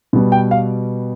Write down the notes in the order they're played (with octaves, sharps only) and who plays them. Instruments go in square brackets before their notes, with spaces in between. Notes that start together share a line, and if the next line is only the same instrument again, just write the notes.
[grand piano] B2 G3 B3
G5
F5